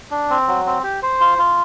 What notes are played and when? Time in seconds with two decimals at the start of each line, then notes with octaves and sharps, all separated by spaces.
0.11 D4
0.30 C4
0.48 F#3
0.66 C4
0.83 G4
1.02 C5
1.20 F4
1.38 F4